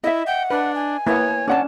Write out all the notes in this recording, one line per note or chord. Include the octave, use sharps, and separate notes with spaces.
E4 D#5 E5
F#5 G5
D4 B4
G#5
A#3 B3 E4 C#5
C#4 D4 C#5 F#5 A5